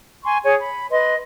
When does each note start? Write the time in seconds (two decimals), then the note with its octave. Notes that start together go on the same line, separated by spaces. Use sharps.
0.24 G#5 C6 C#6
0.44 G#4 C#5 G#5 C#6
0.59 B5
0.90 B4 D#5 C6